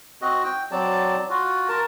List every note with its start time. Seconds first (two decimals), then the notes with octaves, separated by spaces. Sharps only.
0.22 C4 F#4 D#5
0.44 G5
0.71 F#3 C4 D5 A5
1.30 F4 F#4
1.68 A#4 A5